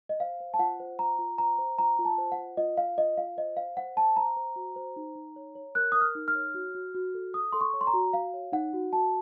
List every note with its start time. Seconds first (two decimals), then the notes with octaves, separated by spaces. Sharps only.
0.09 D#5
0.20 C5 F5
0.40 C5
0.54 A5
0.59 F4 F#5
0.80 C5
0.99 F4 A#5
1.18 F4
1.38 C5 A#5
1.58 C5
1.78 F4 A#5
1.99 F4
2.05 A5
2.18 C5
2.32 F#5
2.38 F4
2.57 F4 D#5
2.77 F4 F5
2.98 F4 D#5
3.17 F4 F5
3.37 C5 D#5
3.57 C5 F5
3.77 C5 F#5
3.96 C5 A5
4.16 C5 A#5
4.37 C5
4.56 F#4
4.76 C5
4.96 D#4
5.16 D#4
5.36 C#5
5.55 C#5
5.75 A#4 F#6
5.92 A#4 D#6
6.01 F6
6.15 D#4
6.28 F6
6.35 C#5
6.54 F#4
6.75 F#4
6.94 F#4
7.14 A4
7.34 A4 D#6
7.52 A4 C6
7.61 C#6
7.73 C#5
7.81 C6
7.87 A#5
7.94 F#4
8.13 F#4 F5
8.34 C#5
8.52 D#4 F#5
8.73 F#4
8.93 F#4 A5